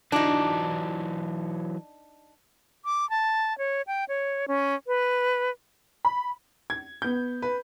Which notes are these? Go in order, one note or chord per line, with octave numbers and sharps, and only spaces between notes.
E3 F#3 D4 D#4
D6
A5
C#5
G5
C#5
C#4
B4
B5
G#6
B3 G6
B4